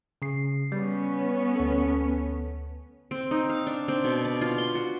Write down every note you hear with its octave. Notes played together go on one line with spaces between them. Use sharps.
C#3 C7
G3 B3 C#4
D2 A4
C4
D#4
F5
D4
C4
B2
D5
F4
C6
F#4